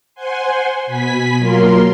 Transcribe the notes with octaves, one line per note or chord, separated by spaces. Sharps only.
C5 F#5 G#5 C6
B2 G#5 B5 B6
F#3 A#3 F4 A#4 C6